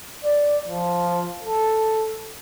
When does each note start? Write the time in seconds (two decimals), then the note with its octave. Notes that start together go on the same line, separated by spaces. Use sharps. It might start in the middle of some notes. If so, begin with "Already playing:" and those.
0.24 D5
0.67 F3
1.43 A4